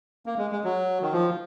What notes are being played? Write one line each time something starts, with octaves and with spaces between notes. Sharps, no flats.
A#3
G#3
G#3
F#3
D#3
F3